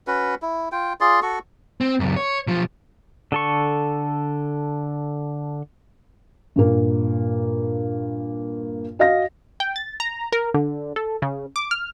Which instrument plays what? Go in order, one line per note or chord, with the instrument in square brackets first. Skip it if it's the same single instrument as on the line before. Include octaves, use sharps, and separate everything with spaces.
[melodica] C#4 F#4 B4
E4
F4 G5
F4 G#4 D5 C6
F#4 A4 C#6
[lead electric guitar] C4
C#2 F#2
C#5
B1 F3
[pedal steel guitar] D3 A4 C#6
[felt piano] G2 A#2 A#3
F#4 D#5 F5 A#6
[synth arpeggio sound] G5
A6
A#5
A#4
D3
A4
C#3
D6
F6